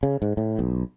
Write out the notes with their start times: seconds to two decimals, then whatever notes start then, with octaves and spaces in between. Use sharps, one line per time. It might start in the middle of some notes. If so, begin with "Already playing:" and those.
0.03 C#3
0.22 G#2
0.37 A2
0.59 B1